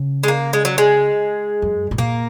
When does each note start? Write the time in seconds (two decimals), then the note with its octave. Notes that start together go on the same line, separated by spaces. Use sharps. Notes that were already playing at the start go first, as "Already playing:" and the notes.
Already playing: C#3
0.24 G#3
0.28 A#3
0.53 G#3
0.65 F#3
0.78 G#3
1.62 F#2
1.91 G#2
1.98 A#2 A#3